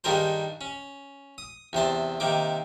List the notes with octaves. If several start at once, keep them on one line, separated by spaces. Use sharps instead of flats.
G2 D#3 G3 G#4 A#4 C5
C#4
D#6
E2 C3 C5 A5
C3 D#3 A#3 D6